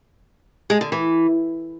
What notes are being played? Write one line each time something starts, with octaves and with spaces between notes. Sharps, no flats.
G#3
D3
E3